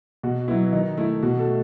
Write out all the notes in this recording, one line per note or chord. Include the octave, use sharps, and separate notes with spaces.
B2 F#4
F#3 B3 E4
D#3 D#4
A3 E4
B2 F#4
A4
A3